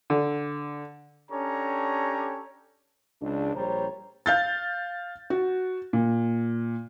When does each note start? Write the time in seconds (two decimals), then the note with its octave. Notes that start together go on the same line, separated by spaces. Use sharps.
0.10 D3
1.32 C#4 D4 G4 A4 C#5 A#5
3.21 C#2 D4
3.54 A#1 G3 C5 C#5 A#5
4.26 F5 G6 A6
5.30 F#4
5.93 A#2